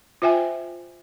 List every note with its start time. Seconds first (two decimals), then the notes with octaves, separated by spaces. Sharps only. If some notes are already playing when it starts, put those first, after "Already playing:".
0.22 F4 C5 E5 G5 G#5